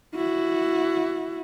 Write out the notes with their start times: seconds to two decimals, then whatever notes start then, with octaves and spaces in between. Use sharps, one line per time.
0.15 E4 F#4